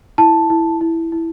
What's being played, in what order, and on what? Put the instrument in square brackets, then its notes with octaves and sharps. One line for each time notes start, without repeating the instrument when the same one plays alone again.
[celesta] E4 A5
E4
E4
E4